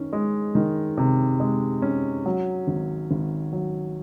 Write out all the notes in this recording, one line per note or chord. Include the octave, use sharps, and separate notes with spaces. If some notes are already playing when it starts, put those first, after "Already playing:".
Already playing: D#3 C#4
G#3
D#3
C3
G#3
C#4
F#3
G#1
G#1
F#3